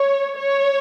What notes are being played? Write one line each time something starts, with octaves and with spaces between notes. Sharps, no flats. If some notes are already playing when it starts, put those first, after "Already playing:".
Already playing: C#5
C#5